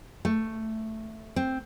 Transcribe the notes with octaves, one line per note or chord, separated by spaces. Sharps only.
A3
C4